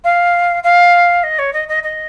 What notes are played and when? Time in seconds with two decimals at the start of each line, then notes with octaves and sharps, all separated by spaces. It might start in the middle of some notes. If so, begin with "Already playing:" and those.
0.04 F5
0.64 F5
1.23 D#5
1.39 C#5
1.53 D#5
1.68 D#5
1.83 D#5